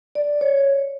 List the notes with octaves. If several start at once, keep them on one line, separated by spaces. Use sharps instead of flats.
D5
C#5